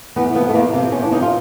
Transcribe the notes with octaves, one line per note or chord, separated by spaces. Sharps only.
E2 B3
C3 F3 B3
A3
E2 A#3
C3 F3 A#3
E2 C#4
D4
C3 F3 D#4
F4